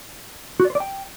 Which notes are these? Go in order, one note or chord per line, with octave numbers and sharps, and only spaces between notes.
F#4
D5
C5
D5
G5